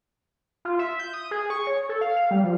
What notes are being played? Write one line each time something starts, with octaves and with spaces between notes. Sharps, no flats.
F4
E5
G6
D#6
G#4
C#6
C#5
A4
F5
F5
G3
F3